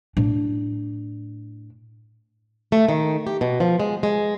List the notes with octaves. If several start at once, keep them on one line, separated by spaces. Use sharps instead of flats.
A2 D4
A3
D#3
G4
B2
F3
G#3
G#3